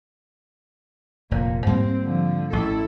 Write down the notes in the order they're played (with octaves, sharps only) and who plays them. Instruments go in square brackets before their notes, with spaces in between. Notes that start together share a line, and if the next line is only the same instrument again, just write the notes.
[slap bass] F1 [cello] A#2
[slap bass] G#2 G3 A#3 [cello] C4
[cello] D3 F3
[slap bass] A1 [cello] E4 A4